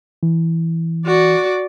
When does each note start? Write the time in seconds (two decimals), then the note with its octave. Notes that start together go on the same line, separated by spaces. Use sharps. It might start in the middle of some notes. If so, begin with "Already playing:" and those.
0.23 E3
1.06 F#4 D5